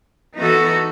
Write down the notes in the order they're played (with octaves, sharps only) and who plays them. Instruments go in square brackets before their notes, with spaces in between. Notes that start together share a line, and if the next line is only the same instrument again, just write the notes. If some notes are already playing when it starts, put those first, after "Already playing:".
[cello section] E3 B3 D#4 F#4 A4